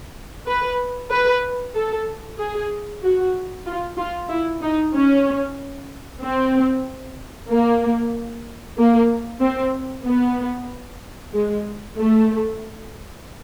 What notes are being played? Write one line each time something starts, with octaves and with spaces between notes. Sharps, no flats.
B4
B4
A4
G#4
F#4
F4
F4
E4
D#4
C#4
C4
A#3
A#3
C4
B3
G#3
A3